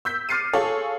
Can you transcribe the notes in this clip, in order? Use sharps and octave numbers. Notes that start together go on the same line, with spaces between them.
E6 G6 B6
D6 F6 A6 C7 C#7 D#7
F4 G#4 A4 C#5